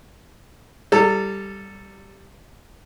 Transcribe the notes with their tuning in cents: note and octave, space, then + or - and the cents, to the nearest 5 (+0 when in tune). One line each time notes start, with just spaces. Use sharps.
G3 +0 A4 +0 A#5 -35